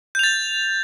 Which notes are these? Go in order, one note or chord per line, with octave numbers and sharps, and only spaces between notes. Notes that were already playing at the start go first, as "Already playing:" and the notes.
G6 A6 F7